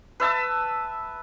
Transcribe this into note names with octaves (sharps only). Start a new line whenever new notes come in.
B4 E5 A5 E6